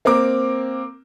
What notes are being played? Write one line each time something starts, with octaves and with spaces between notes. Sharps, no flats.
A#3 C4 A#4 D6